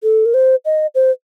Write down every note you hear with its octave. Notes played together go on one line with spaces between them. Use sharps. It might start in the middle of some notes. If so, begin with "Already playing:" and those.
A4
A#4
C5
D#5
C5